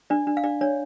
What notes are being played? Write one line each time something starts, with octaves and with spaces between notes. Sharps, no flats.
D4 D5
D4
F5
D4 D5
D4 C#5